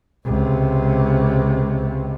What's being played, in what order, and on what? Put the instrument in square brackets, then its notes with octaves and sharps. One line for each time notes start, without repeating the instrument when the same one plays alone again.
[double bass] C#2 C3